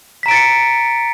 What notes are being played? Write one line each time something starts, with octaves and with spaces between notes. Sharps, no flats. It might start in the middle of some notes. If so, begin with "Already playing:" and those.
A#5 A6 B6 C#7 D7